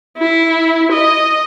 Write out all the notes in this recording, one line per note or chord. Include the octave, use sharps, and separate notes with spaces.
E4
D#5